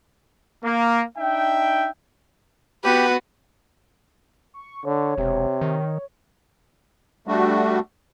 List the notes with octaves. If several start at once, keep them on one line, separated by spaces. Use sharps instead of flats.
A#3
D4 D#4 E5 G5
B3 F#4 G4 B4
C#6
D3 C#5
E1 C3
D#3
G3 A3 D4 F#4